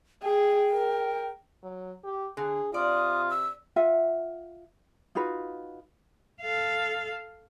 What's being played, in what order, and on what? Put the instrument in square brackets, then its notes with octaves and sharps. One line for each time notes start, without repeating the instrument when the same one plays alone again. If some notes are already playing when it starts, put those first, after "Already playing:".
[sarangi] G#4 [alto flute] G5
[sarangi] A#4
[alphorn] F#3
G4
[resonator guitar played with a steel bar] D3 [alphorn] G#4
[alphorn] C3 [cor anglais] F4 [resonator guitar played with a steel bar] D5 [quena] D#6
[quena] E6
[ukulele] F4 E5 F#5
D#4 F4 F#4 B4
[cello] A4 F5